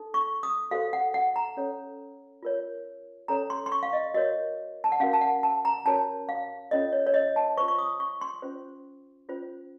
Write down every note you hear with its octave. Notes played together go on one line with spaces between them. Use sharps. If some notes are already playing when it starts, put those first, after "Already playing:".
Already playing: D#4 A4
C#6
D#6
F#4 A4 C5 F5
F#5
F#5
A#5
C#4 A4 C#5
F4 A#4 C#5
C#4 A4 C#5 A#5
C6
C6
C#6
F5
D#5
F#4 A#4 C#5 D#5
A5
F#5
C#4 F#4 A#4 F5
A5
F#5
A5
A#5
C#4 F#4 A#4 C#5 A5
F5
C#4 F4 A4 C#5 D#5
C#5
C#5
D#5
A5
F4 C5 C#6
C#6
D#6
C#6
C6
C#4 F4 C5
C#4 F4 C5